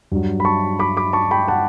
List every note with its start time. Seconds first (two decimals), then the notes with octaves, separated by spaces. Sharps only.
0.12 G2 F#3
0.40 B5
0.45 A5 C#6
0.79 B5 D6
0.97 B5 D6
1.13 A5 C#6
1.31 G5 B5
1.48 F#5 A5